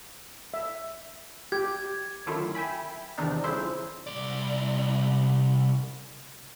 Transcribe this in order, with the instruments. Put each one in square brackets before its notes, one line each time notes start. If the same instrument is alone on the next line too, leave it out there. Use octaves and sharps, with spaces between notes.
[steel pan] E5
[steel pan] G4 [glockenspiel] G#6
[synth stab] F#2 D3 D#3 A3 E4 F4
E5 G5 G#5 B5
E2 C3 D#3 D4 D#4
G1 F2 C#3 E4 C5 E5
[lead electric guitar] C2 D5